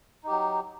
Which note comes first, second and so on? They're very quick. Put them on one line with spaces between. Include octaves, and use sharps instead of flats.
D#4 G4 F#3